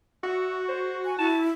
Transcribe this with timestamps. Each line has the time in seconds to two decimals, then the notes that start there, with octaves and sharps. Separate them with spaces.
0.23 F#4 E5
0.69 C5
1.05 G#5
1.18 E4 A5